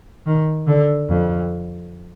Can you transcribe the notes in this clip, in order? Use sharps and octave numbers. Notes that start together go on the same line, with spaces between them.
D#3
D3
F2